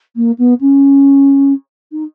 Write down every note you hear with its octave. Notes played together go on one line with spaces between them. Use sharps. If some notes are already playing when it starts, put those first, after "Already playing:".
A#3
B3
C#4
D#4